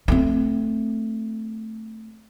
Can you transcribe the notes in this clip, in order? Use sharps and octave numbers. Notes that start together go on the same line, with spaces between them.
A3 C4